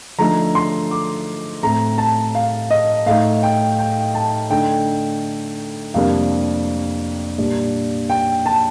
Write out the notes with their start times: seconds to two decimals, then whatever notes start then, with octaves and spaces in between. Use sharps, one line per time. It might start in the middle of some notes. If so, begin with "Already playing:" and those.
0.18 D3 F3 A3 D#4 A#5
0.55 C6
0.91 D6
1.63 A2 A3 C4 A#5
1.98 A5
2.35 F5
2.71 D#5
3.06 A2 A3 D#4 F5
3.43 G5
3.79 G5
4.15 A5
4.50 D3 A3 D#4 G5
5.94 F2 C3 G3 A#3 D4 F5
7.38 A#2 G3 D4
8.10 G5
8.46 A5